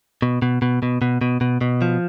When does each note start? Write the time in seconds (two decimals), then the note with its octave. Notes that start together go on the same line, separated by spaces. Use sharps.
0.22 B2
0.42 B2
0.62 B2
0.83 B2
1.02 B2
1.21 B2
1.41 B2
1.61 B2
1.82 F3